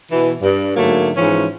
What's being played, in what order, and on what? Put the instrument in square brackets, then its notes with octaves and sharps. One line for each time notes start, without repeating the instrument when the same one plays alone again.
[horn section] B2 E3
G2
G#2 D3 F#3 A3 A#3
G#2 E3 F3 C#4